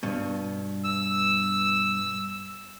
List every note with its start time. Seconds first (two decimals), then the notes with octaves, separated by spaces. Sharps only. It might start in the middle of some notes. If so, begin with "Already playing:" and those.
0.03 G2 B2
0.84 E6